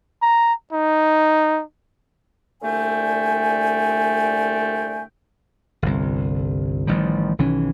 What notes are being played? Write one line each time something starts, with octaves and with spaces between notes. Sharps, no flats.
A#5
D#4
C2 A#2 D3 A3 G5 G#5
G1 C2
A1 D#3 F3 G3
B1 D#3 E3 C#4